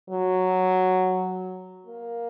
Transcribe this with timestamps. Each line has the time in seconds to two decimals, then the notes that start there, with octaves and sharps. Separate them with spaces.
0.10 F#3
1.87 A#3